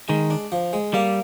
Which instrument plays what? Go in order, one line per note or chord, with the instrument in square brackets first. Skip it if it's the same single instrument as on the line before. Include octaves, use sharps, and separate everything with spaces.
[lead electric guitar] D#3 [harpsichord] G#3
[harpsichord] D4
F3
G#3
[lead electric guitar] G3 [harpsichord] A#3